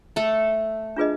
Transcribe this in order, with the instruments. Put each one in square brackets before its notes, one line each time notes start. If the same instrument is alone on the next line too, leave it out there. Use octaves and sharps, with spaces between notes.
[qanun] A3 A4
[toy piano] D4 F4 G#4 B4 D#5